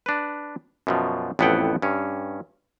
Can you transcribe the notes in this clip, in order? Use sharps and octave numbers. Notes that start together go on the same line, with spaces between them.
D4 B4
F#2 B2 F3
A1 F2 B3 E4 F#5 G5
G2 C#4